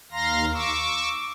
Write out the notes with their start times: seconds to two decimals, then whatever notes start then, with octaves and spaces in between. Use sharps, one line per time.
0.12 D#2 F5 A#5 C6 A#6
0.54 C#6 D6 E6